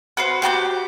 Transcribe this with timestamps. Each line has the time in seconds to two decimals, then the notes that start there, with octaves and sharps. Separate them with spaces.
0.17 F#4 B4 C5
0.42 F#4 G4 A5 G6